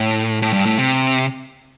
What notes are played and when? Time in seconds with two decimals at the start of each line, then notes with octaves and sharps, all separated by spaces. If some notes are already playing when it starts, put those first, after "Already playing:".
Already playing: A2
0.42 A2
0.53 G2
0.66 A2
0.78 C3